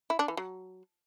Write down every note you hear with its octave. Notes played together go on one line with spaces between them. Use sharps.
E4
D4
E3
F#3